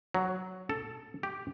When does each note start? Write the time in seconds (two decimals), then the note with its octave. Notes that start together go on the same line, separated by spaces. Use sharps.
0.14 F#3
0.70 A4
1.23 G4